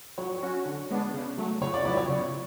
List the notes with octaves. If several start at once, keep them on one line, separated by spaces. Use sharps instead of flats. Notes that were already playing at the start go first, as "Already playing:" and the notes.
F#3 C#5
C#4 F#4
D3
G#3 B3 D4
C#3
F#3 A3
C#3 C#5
D5
F#3 B3 E4 D5
C#5
C#3